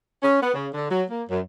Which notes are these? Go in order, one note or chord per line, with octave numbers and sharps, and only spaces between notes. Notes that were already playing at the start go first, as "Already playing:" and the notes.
C#4
B3
C#3
D3
F#3
A#3
F#2